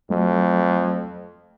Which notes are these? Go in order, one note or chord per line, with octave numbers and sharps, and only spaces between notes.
F2 F#3 A3